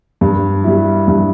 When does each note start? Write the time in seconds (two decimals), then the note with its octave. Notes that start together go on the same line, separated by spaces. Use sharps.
0.21 G2
0.64 G3 E4
1.07 G2